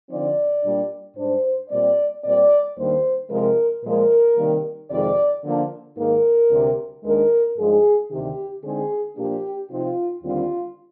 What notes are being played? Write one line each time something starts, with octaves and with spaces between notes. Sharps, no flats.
D3 F3 C4 D#4 D5
A#2 G3 D4
G#2 G3 D4 C5
A#2 G3 C4 D5
A#2 G3 C4 D5
D#2 D#3 G3 A#3 D4 C5
C3 F3 G#3 A#4
A#2 F3 G#3 A#4
C3 D#3 G3 A#3
F2 C3 D#3 G#3 D5
D3 F3 A#3 D4
G#2 D#3 A#3 D#4 A#4
D2 C3 G3
D#2 D#3 G#3 D4 A#4
G2 F3 G#3 D#4 G#4
D2 C3 D#3 G4
D3 G#3 C4 D#4 G#4
A#2 F3 A#3 D4 G4
C3 F3 C4 D#4 F4
D#2 D3 G3 C4 F4